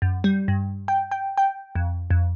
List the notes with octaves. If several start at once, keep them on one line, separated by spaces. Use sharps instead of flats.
F#2
G3
G2
G5
G5
G5
F2
F2